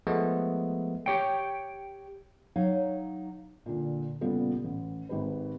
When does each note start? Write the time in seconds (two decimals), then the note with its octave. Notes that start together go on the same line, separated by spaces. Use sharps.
0.07 F3 G#3 A3 B3
1.06 G4 C#5 G5
2.56 F#3 D#4 C#5 F5
3.66 A#2 D3
4.21 A#2 C#3 G3 B3 F4 A4
4.64 A1
5.09 G#1 G4 B4